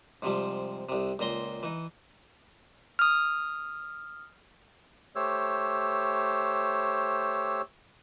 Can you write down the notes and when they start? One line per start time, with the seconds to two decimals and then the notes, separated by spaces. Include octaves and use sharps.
0.22 G#2 C3 F3 G3
0.89 C2 C3
1.19 C#2 A#2 A#5 C6
1.63 E3 D#4
2.99 D#6 F6
5.16 A3 G4 C5 C#5 E6